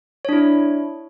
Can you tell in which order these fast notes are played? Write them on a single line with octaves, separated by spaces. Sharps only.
C#5 D4 E4